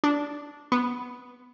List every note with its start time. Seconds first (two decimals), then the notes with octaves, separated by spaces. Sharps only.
0.04 D4
0.72 B3